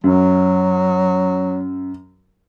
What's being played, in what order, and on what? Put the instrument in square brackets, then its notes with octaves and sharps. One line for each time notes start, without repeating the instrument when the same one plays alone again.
[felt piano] F#2 [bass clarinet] F#3